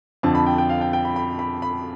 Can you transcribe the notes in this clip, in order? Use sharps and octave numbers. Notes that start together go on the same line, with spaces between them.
F2 D3 F3 A5
B5
G5
G5
F5
G5
G5
B5
B5
B5
B5